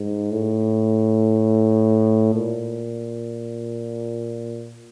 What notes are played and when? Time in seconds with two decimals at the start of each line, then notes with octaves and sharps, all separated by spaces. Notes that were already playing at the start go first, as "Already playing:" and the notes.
Already playing: G#2
0.31 A2
2.34 A#2